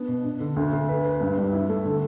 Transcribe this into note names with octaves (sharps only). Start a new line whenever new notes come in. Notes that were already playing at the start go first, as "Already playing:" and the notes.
Already playing: B3 D4
B2
D4
D3
D2
D2
B4
B4
G2
G3
E4
A3
D3